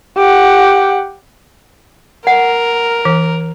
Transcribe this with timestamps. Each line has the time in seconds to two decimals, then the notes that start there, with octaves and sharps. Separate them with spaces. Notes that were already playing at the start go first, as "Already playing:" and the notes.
0.17 G4 F#5
2.27 A#4 F#5
3.05 E3